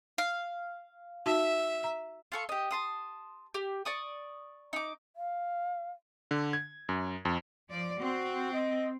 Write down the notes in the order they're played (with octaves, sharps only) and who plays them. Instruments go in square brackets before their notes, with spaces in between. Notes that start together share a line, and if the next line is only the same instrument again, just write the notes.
[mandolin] F5
[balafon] D#4 F#4 A5 [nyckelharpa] E5
[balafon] A#5
[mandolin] F4 A4 C#6
G4 D#5
A5 C6 D#6
G4
D5 C#6 D#6
D#4 D6
[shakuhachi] F5
[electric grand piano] D3
G#6
F#2
F2
[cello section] F3 D5
[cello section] C4 [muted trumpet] F#4
[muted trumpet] D#5